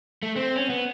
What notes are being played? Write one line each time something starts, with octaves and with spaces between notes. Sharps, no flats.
A3
C4
C#4
B3